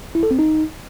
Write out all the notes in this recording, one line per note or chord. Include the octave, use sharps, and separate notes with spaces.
E4
A4
C4
D#4